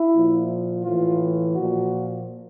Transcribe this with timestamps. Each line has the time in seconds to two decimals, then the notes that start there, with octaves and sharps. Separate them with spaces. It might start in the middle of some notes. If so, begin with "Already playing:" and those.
Already playing: E4
0.14 A#2 F3
0.84 A2 E3 F4
1.55 A#2 F3 F#4